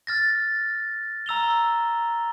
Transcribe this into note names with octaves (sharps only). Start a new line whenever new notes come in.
F6 A6 A#6
A#5 E6 F7 G7